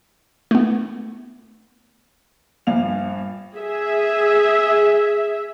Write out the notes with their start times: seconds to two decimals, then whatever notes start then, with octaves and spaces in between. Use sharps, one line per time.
0.51 A3 B3
2.67 A#1 G2 F5 F7
3.56 G#4 E5